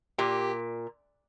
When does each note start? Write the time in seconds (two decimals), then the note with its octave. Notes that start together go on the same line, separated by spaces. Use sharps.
0.18 A#2 G4